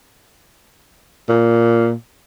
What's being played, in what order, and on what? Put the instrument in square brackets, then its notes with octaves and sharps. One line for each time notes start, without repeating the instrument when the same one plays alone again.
[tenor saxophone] A#2